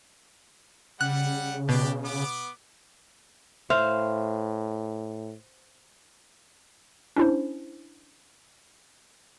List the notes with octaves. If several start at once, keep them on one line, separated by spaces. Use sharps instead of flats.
C#3 G3 F#5 F#6
B2 D4 G4
B3 D6
A2 C5 E5 F5
C#4 D4 E4 C5